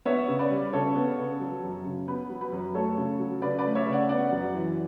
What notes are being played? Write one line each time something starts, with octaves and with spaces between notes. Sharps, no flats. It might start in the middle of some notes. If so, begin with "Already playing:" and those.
B3 C#5 E5
C#3
B4 D5
G3
C#3 A4 C#5
B3
C#3
F#3
F#2
C#3
B3 B4
F#3
B4
F#2
A3 A4 C#5
C#3
F#3
C#3 B4 D5
B4 D5
A3
C#5 E5
C#3
D5 F#5
B3 D5 F#5
F#2
E3